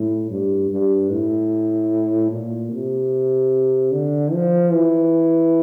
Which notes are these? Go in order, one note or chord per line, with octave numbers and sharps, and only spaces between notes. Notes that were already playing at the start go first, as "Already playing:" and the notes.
Already playing: A2
G2
G2
A2
A#2
C3
D3
F3
E3